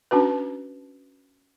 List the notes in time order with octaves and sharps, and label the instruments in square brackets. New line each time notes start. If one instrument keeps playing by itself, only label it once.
[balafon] C#4 D4 F#4 B4